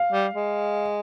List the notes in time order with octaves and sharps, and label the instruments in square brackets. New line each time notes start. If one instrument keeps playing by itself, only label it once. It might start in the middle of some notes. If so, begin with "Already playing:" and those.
Already playing: [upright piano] F5
[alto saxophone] G3
G#3